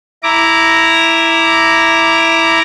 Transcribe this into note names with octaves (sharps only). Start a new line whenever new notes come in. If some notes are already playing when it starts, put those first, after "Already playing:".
E4 A#5 D6